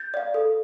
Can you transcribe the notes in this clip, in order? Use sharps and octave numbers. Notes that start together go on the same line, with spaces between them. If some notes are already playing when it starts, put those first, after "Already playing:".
Already playing: G6 A6
D5 F5
A4